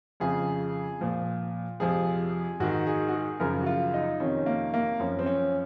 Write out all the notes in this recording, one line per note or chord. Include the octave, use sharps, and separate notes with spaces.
F2 C#3 F3 G#4
A#2 F3
F2 C3 F3 G#4
G#2 D#3 F#4
G#4
F#4
G#4
F#2 C#3 F3 A#4
F#4
F4
D#4
F2 C3 D#3 C#4
A#3
A#3
F#2 F3 C#4
C4
C#4